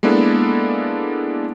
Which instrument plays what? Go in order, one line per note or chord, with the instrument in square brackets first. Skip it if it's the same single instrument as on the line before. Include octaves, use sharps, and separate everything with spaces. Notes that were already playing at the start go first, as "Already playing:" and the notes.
[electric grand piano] G#3 A#3 B3 D4 E4 A4